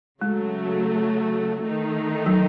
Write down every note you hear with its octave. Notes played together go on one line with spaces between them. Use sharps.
C#3 F#3 G#3 A3
D#3 A3 D#4
F#3